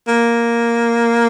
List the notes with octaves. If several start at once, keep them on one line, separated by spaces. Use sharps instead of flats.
A#3